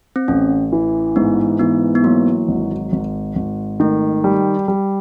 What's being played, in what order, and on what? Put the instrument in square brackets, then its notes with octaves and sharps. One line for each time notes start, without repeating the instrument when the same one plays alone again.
[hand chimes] C4
[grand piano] A1 [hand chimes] C#4
[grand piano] E3
[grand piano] G#2 [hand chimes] B3
[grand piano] E3 [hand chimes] B3
[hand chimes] B3
[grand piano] F#3 [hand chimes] A#3
[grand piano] G#1
G#1
G#1
[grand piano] D#3 [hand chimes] A3
[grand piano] G3
G3